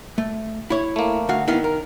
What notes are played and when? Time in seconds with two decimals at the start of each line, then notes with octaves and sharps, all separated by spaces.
0.18 A3
0.70 E4 C#5
0.96 A3 A#3
1.29 D2 F#4 F5
1.48 D#3 B3 E4 F5
1.64 A#4